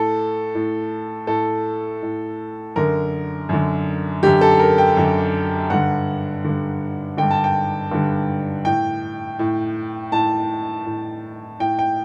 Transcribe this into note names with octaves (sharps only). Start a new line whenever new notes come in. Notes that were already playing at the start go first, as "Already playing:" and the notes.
Already playing: A2 A4
A2
A2 A4
A2
F#2 D3 A#4
F#2 D3
F#2 D3 G4
A4
A#4
G5
F#2 D3
G2 D3 F#5
G2 D3
G2 D3 G5
A5
G5
G2 D3
A2 G5
A2
A2 A5
A2
A2 G5
G5